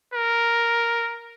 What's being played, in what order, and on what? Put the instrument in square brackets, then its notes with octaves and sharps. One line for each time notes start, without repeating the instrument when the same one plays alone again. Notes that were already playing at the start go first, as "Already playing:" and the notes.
[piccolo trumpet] A#4